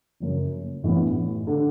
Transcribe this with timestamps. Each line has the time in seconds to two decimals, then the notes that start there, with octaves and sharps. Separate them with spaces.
0.20 F#1 F#2 F#3
0.84 A1 G2 E3 B3
1.47 D3